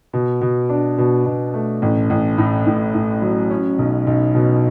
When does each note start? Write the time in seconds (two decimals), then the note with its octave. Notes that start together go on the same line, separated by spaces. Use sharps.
0.13 B2
0.41 B2
0.69 D4
0.98 B2
1.26 B2
1.54 A3
1.82 A1
2.10 A1
2.38 A2
2.67 A2
2.94 A2
3.22 F#3
3.51 C#4
3.78 B1
4.07 B1
4.35 B2